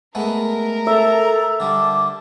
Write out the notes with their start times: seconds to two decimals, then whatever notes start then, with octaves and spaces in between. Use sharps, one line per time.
0.15 G#3 A3 B3 A#4
0.87 A4 E5 A#5
1.60 D3 G3 A5 D6